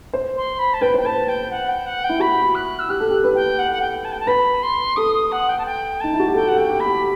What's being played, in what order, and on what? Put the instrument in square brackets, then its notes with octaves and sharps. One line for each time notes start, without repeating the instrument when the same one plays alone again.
[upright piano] C5
[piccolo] C6
B5
A5
[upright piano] B4 [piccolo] G5
[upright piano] C5 [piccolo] G5
[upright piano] B4 [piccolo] A5
[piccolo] G5
F#5
G5
F#5
G5
[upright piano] E4
[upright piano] F#4 [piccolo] B5
[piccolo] F#6
E6
[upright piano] G4 [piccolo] F#6
[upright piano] A4
G4
B4
[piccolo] G5
F#5
F#5
G5
A5
G5
A5
[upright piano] B4 [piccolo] B5
[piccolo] C6
[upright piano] A4 [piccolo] D#6
[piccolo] D#6
F#5
G5
A5
G5
[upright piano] D#4 [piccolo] A5
[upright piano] E4
F#4
G4
[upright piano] A4 [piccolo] G5
[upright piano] A4 [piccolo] F#5
[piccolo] G5
[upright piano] G4
[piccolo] B5
[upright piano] G4